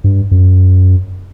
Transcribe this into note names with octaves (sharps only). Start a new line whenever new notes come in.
G2
F#2